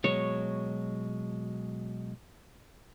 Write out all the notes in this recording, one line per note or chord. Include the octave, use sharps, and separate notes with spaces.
B2 F#3 G#3 C#5